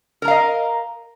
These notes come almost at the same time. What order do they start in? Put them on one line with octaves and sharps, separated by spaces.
A#4 A#5 F5 D#5